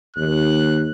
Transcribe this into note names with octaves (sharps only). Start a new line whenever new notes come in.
D#2 F#6